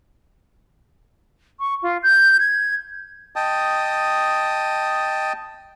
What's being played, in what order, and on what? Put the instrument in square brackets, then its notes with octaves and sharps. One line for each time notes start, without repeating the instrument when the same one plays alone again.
[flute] C#6
F4
G6
G#6
[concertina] D#5 G5 A5 D#6